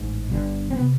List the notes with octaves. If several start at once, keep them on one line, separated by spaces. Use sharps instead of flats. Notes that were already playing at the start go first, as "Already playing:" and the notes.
Already playing: A1 G#2
G1 G2 D3
C4
B3
C3